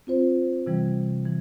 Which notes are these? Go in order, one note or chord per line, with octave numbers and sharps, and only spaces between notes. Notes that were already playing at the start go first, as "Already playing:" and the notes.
C4 F4 C5
C3 E3 G3
E3